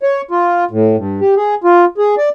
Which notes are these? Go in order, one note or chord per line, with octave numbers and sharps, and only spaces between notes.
C#5
F4
A2
G2
G4
G#4
F4
G#4
D5